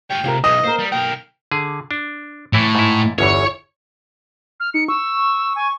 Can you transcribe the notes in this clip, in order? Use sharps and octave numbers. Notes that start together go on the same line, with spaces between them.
F4 C#5 G5
C3 G#3 F4 A#4
B1 E3 D#5 D#6
A#3 A#4 C5
G3
B1 A#3 A#4 G5
D3 G#4
D4
A2 E3 E4 C#5
G#2 E4
G1 E2 E3 C#5
F6
D#4 C#7
C#6 E6
G#5